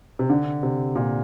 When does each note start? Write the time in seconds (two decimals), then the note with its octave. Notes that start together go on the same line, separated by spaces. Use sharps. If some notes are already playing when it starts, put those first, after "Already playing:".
0.19 C3
0.30 D3
0.63 C3
0.95 A#2